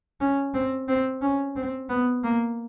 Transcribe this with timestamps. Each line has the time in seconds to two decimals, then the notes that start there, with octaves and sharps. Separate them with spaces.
0.20 C#4
0.54 C4
0.88 C4
1.22 C#4
1.56 C4
1.89 B3
2.24 A#3